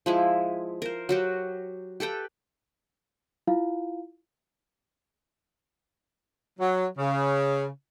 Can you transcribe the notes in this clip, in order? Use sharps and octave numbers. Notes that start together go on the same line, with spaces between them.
F3 G#3 E4
A#4 C5
F#3 F#4 G4
G4 A4 B4 G5
E4 F4 F5
F#3
C#3